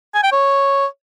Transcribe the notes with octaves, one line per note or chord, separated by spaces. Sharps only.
G#5
G5
C#5